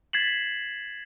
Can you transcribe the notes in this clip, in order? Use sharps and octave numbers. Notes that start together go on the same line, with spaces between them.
G#6 A6 B6 C7 E7 F#7